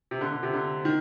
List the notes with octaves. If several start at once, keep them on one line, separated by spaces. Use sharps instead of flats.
C3
D3
D3
C3
D3
D#3